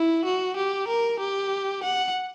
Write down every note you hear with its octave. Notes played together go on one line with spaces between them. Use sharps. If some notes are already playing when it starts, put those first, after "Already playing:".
Already playing: E4
F#4
G4
A#4
G4
F#5